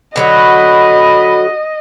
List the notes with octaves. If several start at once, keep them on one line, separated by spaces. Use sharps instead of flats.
D3 F#3 F#4 D#5 B5